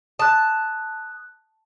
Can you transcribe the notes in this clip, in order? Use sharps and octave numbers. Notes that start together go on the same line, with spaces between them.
A5 D#6 F#6